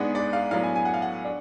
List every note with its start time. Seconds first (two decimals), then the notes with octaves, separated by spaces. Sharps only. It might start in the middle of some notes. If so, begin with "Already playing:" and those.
Already playing: G#2 G#3 B3 D4 F#5
0.15 D5
0.33 F5
0.51 A2 F#3 B3 D4 F5
0.63 G#5
0.76 G#5
0.85 F#5
0.94 F5
1.02 F#5
1.25 D4